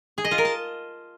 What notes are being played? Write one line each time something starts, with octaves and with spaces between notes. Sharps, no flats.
G#4
D#5
F4
A#4
A5